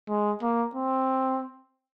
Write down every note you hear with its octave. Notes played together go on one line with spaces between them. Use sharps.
G#3
A#3
C4